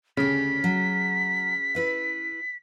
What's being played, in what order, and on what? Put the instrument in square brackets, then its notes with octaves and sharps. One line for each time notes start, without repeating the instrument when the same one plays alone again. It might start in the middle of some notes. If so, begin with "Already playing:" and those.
[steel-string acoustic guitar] D2 G4 [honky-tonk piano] C#3 [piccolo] B6
[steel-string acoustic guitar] F#3
E4 B4 E5